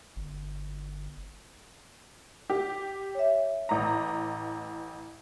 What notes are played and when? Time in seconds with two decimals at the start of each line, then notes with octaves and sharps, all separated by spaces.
0.16 G1
2.50 G4
3.15 C#5 E5
3.69 A1 A#5